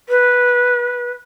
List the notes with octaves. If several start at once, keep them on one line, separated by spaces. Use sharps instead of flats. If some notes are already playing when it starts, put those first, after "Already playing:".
B4